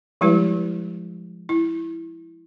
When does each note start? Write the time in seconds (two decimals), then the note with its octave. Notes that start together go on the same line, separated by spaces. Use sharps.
0.21 F3 G3 G#3 E4 G4 B4
1.49 E4